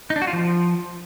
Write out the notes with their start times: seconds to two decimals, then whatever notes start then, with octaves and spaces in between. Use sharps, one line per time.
0.10 D#4
0.16 D4
0.22 F#4
0.27 F4
0.33 F3